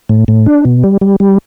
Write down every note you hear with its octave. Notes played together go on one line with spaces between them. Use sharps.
A2
A2
D4
B2
G3
G3
G3